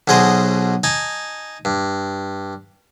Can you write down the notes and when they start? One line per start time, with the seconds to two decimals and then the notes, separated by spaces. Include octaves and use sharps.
0.08 B1 B2 G#4 C5 D#5
0.84 D#4 G#5 A5
1.65 G2